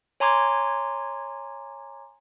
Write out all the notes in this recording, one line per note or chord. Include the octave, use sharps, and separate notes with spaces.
C#5 G#5 A#5 C6 D6 G#6